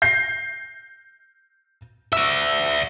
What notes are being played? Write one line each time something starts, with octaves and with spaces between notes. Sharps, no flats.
G6 A#6 C7
D5 E5 E6